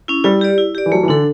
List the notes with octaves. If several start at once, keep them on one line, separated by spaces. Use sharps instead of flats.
C#4 E4
G3 E4
G4 D5
E4
G4 D5
E3
F#3 A3
E3
D3 D4 A4